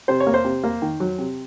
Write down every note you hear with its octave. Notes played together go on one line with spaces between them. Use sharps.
C3 C5
C#5
A#3
C5
C3
A#3
D#3
F#3
C3